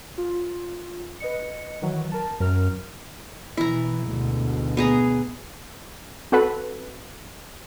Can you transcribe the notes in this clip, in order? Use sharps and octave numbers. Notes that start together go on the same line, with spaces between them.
F4
B4 D#5 C#7
D#3 E3 F#3
A#4 A5
F#2 A#4 F6
B2 E3 E4 A#5
D2 G#2 B2
B3 G#4 A#5
C4 F#4 A4 B4